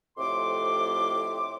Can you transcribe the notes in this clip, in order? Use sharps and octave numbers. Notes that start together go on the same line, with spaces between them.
F2 A2 C3 C6 D6